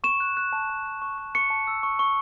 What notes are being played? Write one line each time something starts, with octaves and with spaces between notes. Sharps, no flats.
C#6 E7
F#6
F#6
A5
A5
F#6
C#6
C#6
C#6 C#7
A5
E6
C#6
C#6